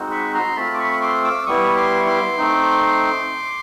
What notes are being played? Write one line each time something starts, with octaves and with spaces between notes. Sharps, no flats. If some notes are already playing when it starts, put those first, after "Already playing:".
Already playing: G#3 C4 D#4 F#4
B5 C#6
A#5 C6
A3 C4 F4 A5 B5
D6
B5 C#6
C6 D6
D6 E6
G3 B3 E4 C#6 D#6
C6 D6
C#6
C6 D6
A3 C4 D#4